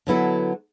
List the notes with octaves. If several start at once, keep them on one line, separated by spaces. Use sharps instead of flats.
D3 F#3 B3 E4 A4